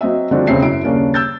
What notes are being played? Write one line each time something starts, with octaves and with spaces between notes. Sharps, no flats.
F#3 C4 D#5 E5
D3 F3 G3 C4 D4 F#4
E1 C#3 C4 C#5 E5 C7
F#2 E4 E5 D7
D#1 C#3 A#3 C#4 D4
E6 G6 A6